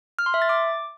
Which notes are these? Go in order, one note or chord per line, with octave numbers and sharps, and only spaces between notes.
F6
C6
E5
A6
D6